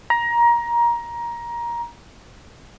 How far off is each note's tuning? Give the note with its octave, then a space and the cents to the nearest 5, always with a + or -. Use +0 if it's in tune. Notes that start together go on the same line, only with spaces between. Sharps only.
A#5 +20